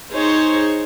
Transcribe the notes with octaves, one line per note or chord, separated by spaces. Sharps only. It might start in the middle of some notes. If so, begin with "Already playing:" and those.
D#4 G#4 C5 C#5